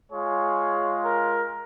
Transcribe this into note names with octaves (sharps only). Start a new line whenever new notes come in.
G#3 F4 G#4 C#5
A#4